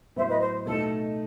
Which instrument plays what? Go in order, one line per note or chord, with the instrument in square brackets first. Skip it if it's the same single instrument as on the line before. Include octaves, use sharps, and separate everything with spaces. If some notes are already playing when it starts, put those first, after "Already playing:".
[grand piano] A2 F#3 B3 [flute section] C5 E5
[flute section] B4 D#5
C5
[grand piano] B2 A3 D#4 [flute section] A4